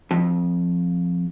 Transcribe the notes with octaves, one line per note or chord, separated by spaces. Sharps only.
F2